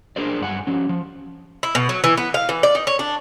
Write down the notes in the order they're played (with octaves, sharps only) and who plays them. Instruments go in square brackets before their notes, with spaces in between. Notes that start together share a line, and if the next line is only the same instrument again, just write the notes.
[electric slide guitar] D4 G#4 A#4 C5 D5
G2 F#5 G#5
F3 C#4
F3
[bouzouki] E4
B2
F#3
E3
B3
F5
E3
D5
D#4
C#5
D4